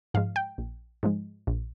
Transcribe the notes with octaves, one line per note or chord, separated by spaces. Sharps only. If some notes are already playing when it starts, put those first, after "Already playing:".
G#2 F3 G#3 F5
G5
A#1
G#2 F3 G#3
A#1